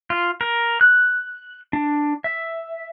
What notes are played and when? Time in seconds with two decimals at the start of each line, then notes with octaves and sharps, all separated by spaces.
0.10 F4
0.41 A#4
0.81 F#6
1.73 D4
2.24 E5